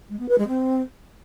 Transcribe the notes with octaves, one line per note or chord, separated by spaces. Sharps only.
G#3
B3
B4
G#3
C4